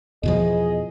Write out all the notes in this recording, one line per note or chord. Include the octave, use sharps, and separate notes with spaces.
E2 B2 F3 G#4 D#5